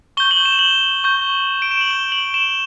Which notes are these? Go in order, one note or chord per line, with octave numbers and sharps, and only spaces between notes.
C#6 G6 G7
F#7
E7
F#7
C#6 G6
D7
E7
F#7
C#6 G6 G7
F#7
E7